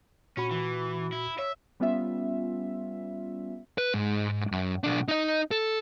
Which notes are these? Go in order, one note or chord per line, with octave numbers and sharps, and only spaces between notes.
A#2 C#4 F#4 B5
E3
E4
C#5 E5
G3 B3 C#4 F4 E5
B4
G#2 G#3
F#2
B1 D4
D#4 D#5
A4